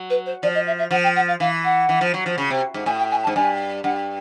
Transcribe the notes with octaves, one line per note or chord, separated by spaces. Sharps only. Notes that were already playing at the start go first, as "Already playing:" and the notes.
Already playing: F#3
B4
C5
F3 D5
D#5
E5
E5
F3 F#5
G5
F#5
F5
E3 F5
F#5
E3
F3
F#3
F3
C#3
C3
G#2
A2 G#5
G5
G#5
A5
G#2
G2 G#5
G2 F#5